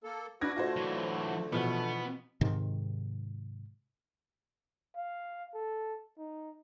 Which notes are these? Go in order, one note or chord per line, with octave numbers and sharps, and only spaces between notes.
A#3 A4
D4 E4 F#4 B4 G#6 A#6
D3 A3 F4 F#4 C5
E3 F#3
B2 E3 F3 B3
G#2 C3 D#3
F5
A4
D#4